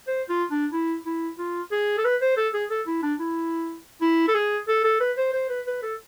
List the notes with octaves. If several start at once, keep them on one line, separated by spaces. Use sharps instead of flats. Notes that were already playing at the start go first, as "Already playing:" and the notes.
C5
F4
D4
E4
E4
F4
G#4
A4
B4
C5
A4
G#4
A4
E4
D4
E4
E4
A4
G#4
A4
A4
B4
C5
C5
B4
B4
A4